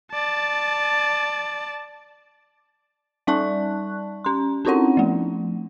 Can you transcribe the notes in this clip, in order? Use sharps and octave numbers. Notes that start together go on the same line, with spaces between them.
D5 A5
G3 D#4 D5 A5 C#6 F#6
C#4 C6
C4 C#4 D#4 E4 C#5 F#5
F3 A3